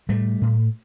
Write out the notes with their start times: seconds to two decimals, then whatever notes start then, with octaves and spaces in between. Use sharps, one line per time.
0.09 A2 G3 A3
0.41 A2